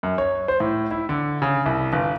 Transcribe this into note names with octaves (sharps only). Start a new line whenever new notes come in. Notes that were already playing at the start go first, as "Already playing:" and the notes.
F#2
C#5
C5
A2
E4
D3
C#3
C2
G1